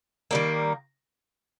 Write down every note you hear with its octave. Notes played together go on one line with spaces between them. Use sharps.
D#3 G3 A#3